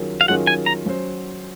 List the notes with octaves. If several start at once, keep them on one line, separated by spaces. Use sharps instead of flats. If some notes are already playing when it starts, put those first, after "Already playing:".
Already playing: D#3 F#3 C#4 F4 G#4
F5
D#3 F#3 C#4 F4 G#4 F#5
G#5
A#5
F#3 C#4 F#4 C5